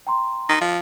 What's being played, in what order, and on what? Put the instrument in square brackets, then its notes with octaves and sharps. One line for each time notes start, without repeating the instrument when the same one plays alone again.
[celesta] G5 A#5 C6
[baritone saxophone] D#4
F3